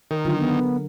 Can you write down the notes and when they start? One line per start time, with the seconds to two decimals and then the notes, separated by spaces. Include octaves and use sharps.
0.11 D#3 A#4
0.25 D3 F#3 F4
0.39 B3